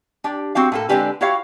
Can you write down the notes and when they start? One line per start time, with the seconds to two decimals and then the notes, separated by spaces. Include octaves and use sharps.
0.24 D4 G4
0.55 C4 F#4 G4 F5
0.72 A2 A#3 A4
0.89 D3 G#3 C4 D4 G4 B4
1.21 E4 F#4 G4 C#5 F5